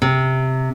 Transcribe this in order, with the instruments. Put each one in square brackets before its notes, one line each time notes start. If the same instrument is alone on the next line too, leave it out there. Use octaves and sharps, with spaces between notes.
[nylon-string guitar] C3